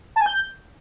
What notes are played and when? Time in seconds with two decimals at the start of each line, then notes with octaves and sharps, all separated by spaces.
0.16 A5
0.21 G#5
0.26 G6